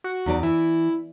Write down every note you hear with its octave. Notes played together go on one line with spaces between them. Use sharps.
F#4
E2 D#4 D5
E3 E4